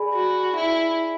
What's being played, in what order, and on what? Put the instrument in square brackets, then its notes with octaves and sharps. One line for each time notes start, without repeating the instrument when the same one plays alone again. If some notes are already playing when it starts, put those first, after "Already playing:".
Already playing: [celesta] G#4 D5 G#5 B5
[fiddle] F#4
E4